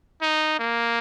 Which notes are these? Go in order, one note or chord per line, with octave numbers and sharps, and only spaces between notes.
D#4
A#3